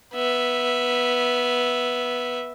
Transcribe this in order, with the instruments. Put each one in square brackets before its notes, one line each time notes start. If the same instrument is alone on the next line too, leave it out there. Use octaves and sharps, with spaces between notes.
[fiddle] B3 E5